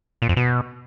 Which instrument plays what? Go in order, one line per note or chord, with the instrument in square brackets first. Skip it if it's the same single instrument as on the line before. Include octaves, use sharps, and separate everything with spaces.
[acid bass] A#2
F2
B2